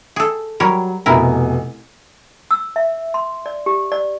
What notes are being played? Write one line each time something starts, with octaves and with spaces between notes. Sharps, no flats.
G#4 A4
F#3 G3 A#4 C#5
F1 B2 E4 A#4 G#5
E6
E5
C6
D5
G4
D5